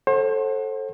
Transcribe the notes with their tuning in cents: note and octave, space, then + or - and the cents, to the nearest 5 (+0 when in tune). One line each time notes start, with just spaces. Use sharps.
A4 +0 C5 +40 F#5 +0